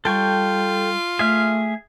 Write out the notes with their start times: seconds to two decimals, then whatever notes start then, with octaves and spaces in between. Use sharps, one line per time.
0.05 G3 F4 A4 G5 C#6
1.19 A3 G#4 E5 F6